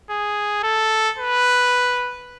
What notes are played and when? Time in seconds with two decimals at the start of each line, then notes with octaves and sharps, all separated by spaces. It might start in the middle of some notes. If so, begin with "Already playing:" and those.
0.10 G#4
0.63 A4
1.18 B4